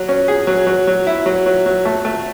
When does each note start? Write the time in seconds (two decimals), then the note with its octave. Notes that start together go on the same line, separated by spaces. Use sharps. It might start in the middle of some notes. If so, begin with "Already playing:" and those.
Already playing: F#3
0.09 C#4
0.28 G#4
0.47 F#3
0.67 F#3
0.87 F#3
1.07 E4
1.26 F#3
1.46 F#3
1.66 F#3
1.85 A3
2.05 A3